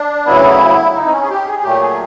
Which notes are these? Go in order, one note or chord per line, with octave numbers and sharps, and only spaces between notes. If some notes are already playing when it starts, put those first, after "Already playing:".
Already playing: D4
D2 C#3 F#3 B3 E4
D#4
C4
C#4
G#4
G4
G#4
G#4
A#2 F#3 A3 G4
G#4